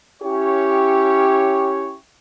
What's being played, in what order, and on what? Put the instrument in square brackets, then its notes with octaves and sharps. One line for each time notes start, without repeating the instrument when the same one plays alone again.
[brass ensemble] C#4 E4 G4 C#5